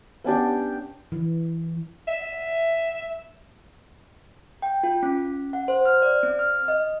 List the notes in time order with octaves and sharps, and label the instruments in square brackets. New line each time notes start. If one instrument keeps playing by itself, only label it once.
[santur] B3 C#4 D4 G4
[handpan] E3
[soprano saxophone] E5
[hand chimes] G5
F4
C#4
F#5
C5
F6
D5
C4
F6
D#5